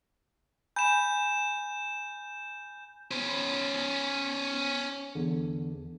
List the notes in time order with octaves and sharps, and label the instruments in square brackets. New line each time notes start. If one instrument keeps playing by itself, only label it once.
[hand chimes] G#5 B5 [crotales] G6 E7
[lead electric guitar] C#4 C5
[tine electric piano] E2 D3